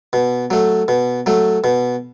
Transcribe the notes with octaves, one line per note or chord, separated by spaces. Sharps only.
B2
F#3 A3
B2
F#3 A3
B2